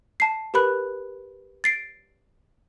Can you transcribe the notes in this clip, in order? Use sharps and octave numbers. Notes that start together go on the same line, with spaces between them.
A5 C7
G4 A#4 B4 B5 F#6
A6 C7 D7